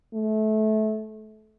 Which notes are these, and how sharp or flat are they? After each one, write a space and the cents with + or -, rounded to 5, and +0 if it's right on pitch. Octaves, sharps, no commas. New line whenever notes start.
A3 -25